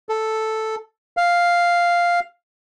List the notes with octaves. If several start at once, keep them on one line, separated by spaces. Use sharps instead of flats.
A4
F5